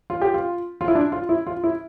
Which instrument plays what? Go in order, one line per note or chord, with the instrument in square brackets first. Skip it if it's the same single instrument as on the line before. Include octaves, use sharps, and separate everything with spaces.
[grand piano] F4
G4
F4
F4
E4
D4
F4
E4
F4
E4